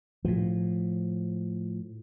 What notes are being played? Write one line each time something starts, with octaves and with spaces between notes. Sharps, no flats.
A2 F3